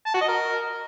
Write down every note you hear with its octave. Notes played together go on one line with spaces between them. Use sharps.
A5
F#4
D#5
A#4